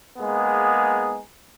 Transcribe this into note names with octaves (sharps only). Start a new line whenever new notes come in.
G#3 A#3 B3 D#4 G#4